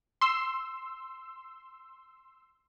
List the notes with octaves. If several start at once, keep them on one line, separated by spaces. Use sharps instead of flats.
C6 E6